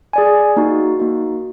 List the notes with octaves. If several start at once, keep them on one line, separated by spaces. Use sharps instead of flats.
G#4 D5 G#5
A#3 D#4 F#4
A#3 D#4 F#4